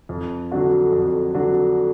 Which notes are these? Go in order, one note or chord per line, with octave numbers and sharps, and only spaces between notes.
F2
D3 F#3 D4 F#4
F2
D3 F#3 D4 F#4